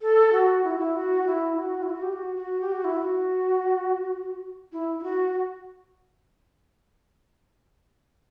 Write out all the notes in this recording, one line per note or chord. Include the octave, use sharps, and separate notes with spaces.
A4
F#4
E4
F#4
E4
F#4
E4
F#4
E4
F#4
G4
F#4
F#4
G4
F#4
E4
F#4
E4
E4
F#4